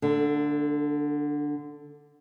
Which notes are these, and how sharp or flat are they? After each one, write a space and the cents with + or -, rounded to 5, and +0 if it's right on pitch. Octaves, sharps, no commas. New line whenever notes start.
D3 +0 A3 +40